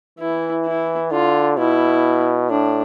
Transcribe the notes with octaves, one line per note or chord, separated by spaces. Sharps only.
E3 E4
E4
D3 F4
B2 E4
A2 D4